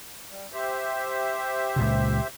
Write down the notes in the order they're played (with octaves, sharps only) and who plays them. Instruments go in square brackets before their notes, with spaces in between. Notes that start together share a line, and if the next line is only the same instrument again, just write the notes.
[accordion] G3
G4 C5 E5
[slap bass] C#2 A#2 C#3